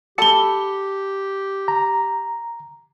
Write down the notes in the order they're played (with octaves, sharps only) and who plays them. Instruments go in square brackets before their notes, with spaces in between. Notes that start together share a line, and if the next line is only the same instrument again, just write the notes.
[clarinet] G4 [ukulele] A4 A5 B5 [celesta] C#7 G7
[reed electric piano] A#5